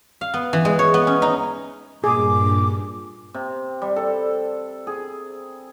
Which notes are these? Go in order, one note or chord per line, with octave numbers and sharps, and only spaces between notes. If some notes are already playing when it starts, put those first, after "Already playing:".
F5
B3
E3
G#3
C#5
B3
C#4
D#4
G2 A#2 G#4 D6
C3
G3
A4
G#4